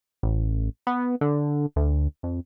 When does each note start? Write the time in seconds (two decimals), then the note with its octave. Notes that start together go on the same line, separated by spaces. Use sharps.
0.23 A1
0.87 B3
1.21 D3
1.76 D2
2.23 F2